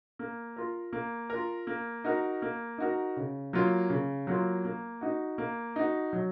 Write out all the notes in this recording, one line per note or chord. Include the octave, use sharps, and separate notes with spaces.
A#3
F4 A#4
A#3
A#4
F4
A#3
D#4 F#4 A#4
A#3
D#4 F#4 A#4
C#3
F#3 A#3 F4
C#3
F#3 A#3 F4
A#3
D#4 F#4
A#3
D#4 F#4
F#3